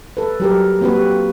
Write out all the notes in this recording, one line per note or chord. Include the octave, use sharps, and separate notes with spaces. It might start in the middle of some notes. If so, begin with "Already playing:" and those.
A4 B4
F#3 G4 A#4
A#3 C4 F#4 B4
G4